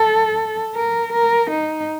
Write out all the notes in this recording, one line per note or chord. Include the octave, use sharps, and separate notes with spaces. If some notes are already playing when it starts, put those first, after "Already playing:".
Already playing: A4
A#4
A#4
D#4